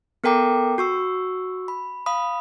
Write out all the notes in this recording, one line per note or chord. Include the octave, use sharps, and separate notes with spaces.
B3 A4 A#4 G5 A#5 D6
F#4 C#6 E6
B5
F5 B5 D#6